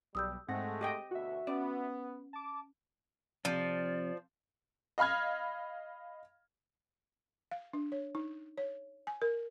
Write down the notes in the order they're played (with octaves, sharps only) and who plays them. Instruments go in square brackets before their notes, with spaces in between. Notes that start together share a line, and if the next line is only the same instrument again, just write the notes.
[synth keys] B1 [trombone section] G3 [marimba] D#6 E6 G6
[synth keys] G#2 F#5 A#6 [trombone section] G#3 A3 [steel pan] C4
[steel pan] G4 D#5 G5
[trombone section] D2 B2 [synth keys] F#4 E5
[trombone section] B3 [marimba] C#4 [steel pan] D5
[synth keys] A5 D6
[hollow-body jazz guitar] F2 C3 [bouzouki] F3 [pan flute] D5
[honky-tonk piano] D#5 F5 B5 F6 G#6
[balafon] F5
D4
C#5
D#4
C#5
G#5
A#4